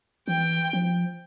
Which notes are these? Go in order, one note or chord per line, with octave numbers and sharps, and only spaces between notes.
E3 G5
F3